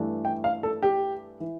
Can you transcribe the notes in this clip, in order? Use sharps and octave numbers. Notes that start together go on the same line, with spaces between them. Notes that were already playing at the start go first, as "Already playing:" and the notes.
Already playing: G2 E3 A3 D4
G5
F5
A4
G4
E3